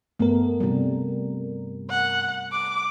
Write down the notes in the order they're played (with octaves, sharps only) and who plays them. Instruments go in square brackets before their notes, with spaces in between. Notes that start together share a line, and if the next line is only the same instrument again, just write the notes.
[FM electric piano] G2 A#4 [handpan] A3 B3
[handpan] C3 G3
[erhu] F#5
D6